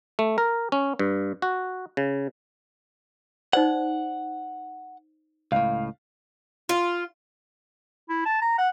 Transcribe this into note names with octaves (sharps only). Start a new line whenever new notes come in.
A3
A#4
C#4
G2
F#4
C#3
D#4 C5 D5 F#5
C#2 A2 F5
F4
E4
A5
A#5
F#5